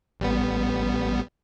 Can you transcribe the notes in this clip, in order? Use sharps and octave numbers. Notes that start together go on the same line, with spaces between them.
A1 G3 B3